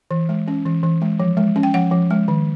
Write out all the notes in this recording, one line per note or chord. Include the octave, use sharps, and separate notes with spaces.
E3
G#3
C#4
E3
E3
G#3
F3
G#3
C#4
G5
F3 F#5
F3
G#3
D#3